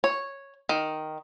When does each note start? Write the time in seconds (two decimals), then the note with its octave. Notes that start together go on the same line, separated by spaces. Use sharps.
0.04 C#5
0.69 D#3